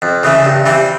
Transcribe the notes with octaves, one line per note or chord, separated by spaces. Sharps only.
F2
C#3 E3 A3
G2
E3 G3 C4